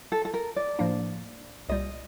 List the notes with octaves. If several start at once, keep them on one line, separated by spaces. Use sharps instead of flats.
A4
A4
A#4
D5
A2 F3 A#3 D4
C2 A#2 G3 D#5